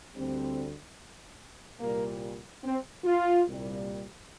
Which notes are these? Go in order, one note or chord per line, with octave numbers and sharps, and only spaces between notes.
D2 D3 G3 C4
C2 A#2 G3 A#3
C4
F4
C2 A#2 G3